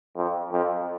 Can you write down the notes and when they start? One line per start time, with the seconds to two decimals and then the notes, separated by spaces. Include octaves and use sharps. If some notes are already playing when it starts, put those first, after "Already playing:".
0.16 F2
0.52 F2